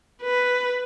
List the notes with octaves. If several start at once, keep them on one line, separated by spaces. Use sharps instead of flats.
B4